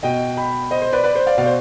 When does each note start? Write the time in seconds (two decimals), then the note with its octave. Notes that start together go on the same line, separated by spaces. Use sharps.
0.03 B2 D#5 G5
0.37 G5 B5
0.70 C5 D#5
0.82 C5
0.93 B4 D5
1.04 B4 D5
1.15 C5
1.26 D5 F5
1.37 B2 D5 F5
1.46 C5